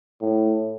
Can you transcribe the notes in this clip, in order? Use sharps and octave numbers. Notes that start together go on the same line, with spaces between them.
A2